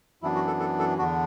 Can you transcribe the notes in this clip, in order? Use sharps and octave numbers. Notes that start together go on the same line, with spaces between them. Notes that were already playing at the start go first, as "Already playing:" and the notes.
F#2 E3 B3 D4 E4
F#4
A4
A4
A4
E2 D3 B3 D4 F#4